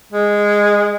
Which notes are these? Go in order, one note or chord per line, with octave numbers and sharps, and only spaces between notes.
G#3